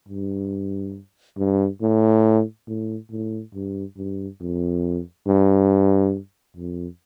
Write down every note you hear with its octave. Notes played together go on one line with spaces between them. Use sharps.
G2
G2
A2
A2
A2
G2
G2
F2
G2
F2